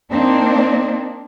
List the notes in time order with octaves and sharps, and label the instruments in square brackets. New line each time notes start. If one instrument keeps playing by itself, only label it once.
[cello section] A#3 C4 D4 D#4